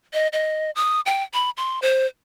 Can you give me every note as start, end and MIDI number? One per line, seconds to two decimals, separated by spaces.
0.13 0.28 75
0.33 0.71 75
0.75 1.01 87
1.06 1.23 79
1.34 1.50 83
1.57 1.79 84
1.82 2.06 72